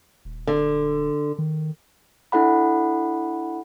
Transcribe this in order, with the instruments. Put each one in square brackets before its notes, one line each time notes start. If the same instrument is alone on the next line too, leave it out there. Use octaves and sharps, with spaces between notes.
[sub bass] D#1
[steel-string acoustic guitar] D3
[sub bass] D#3
[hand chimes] D4 E4 A4 F#5 B5